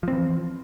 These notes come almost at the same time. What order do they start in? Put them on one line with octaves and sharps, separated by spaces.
F3 C4 E3